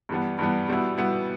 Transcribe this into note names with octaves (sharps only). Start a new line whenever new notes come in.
G2 E3 G3 B3
G2 E3 G3 B3
B2 G3 B3 E4
B2 G3 B3 E4